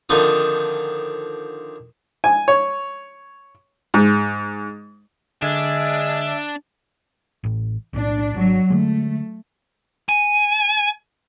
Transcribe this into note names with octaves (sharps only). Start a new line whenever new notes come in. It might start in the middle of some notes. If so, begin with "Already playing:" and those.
D3 D#3 F3 C4 D#4 D#6
G#5
C#5
G#2
D3 G#3 D4 E5 G#6
A1 A2
B1 A2 D4
G#1 F#3
D3 G#3 A3
G#5